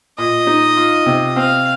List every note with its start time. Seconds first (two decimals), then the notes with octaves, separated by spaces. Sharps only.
0.18 A#2 D#5
0.47 D#4
0.77 F4
1.06 C3
1.36 C4 F5